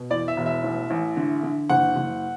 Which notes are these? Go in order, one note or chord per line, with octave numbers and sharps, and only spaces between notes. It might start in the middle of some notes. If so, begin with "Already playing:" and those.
Already playing: B2
E2 D5
E5
E1
E5
A1
A1
D3
D3
F#1 F#5
F#1